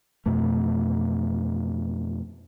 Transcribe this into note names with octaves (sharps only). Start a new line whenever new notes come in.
F2 B2 A3